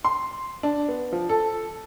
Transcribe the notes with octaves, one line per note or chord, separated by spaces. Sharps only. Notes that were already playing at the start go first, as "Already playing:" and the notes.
C6
D4
B3
F3
A4